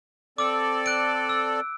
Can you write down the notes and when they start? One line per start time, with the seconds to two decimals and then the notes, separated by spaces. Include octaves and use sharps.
0.38 C4 A4 D5 D6 E6
0.86 F#6 D7
1.29 E6